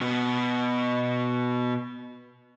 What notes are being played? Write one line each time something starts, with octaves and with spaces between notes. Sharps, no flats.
B2 B3